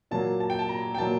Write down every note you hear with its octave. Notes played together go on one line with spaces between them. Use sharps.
A#2 F#3 A#3 A5
A5
G5
A5
A#5
G5
A#2 F#3 A#3 A5